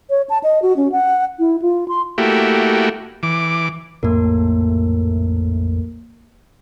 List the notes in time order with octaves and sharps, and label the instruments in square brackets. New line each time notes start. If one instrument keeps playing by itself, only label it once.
[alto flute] C#5
A5
D#5
F#4
C#4
F#5
E4
F4
C6
[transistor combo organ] A3 A#3 E4 F#4 G4
E3 D6
[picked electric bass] A#1 F2 A2 [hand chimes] A#3 A#4